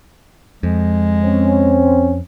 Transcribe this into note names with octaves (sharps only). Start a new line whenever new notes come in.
F2 G#3
C4 C#4